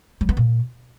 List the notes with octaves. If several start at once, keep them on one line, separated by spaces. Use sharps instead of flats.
F#3
B3
A#2